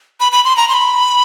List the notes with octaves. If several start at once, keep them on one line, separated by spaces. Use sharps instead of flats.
B5
B5
C6
A#5
C6
B5